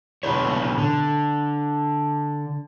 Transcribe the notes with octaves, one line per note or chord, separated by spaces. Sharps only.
B2 D3 B4 C#5
D3